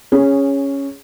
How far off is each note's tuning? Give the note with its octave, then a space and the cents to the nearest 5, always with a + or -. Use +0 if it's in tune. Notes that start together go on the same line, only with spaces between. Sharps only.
C#4 +0 G#4 -15